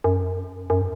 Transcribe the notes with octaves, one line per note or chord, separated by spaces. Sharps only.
F#2
F#2